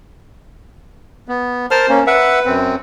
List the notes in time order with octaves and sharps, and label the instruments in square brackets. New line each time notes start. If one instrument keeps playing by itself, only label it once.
[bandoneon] B3
[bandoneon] A#4 A5 F6 [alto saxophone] C5
[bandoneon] A#3 C#4
[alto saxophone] B4 [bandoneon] E5 F#5
[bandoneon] F#2 C4